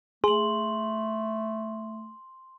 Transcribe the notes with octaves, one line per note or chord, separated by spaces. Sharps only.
A3 G#4 C6 F#7